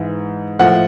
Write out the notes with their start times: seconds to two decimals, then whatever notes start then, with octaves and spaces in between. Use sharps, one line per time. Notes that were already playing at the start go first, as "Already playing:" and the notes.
Already playing: G#2 E3
0.59 A2 F3 F#5